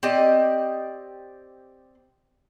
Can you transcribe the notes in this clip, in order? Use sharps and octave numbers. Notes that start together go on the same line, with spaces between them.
C4 G4 D5 D#5